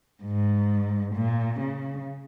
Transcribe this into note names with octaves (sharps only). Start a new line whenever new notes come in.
G#2
A#2
C#3